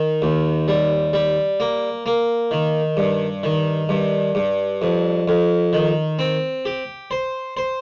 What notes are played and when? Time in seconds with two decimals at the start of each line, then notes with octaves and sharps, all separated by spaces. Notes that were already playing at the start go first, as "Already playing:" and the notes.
Already playing: D#3
0.22 D#2
0.68 G3
1.13 G3
1.60 A#3
2.06 A#3
2.51 D#3
2.97 G2
3.43 D#3
3.89 G2
4.35 G2
4.82 F2
5.28 F2
5.73 D#3
6.19 C4
6.65 G4
7.11 C5
7.57 C5